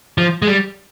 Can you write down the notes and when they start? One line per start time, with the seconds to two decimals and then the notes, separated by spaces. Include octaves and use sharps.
0.18 F3
0.42 G#3
0.47 G3